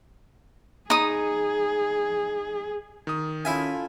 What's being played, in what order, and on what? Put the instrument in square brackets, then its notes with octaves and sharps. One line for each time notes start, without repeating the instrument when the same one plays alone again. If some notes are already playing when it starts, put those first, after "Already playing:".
[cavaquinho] D#4 D#6 [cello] G#4
[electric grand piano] D#3 D#6
[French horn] C#4 [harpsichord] E4 E5 G#5 [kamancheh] F4 A4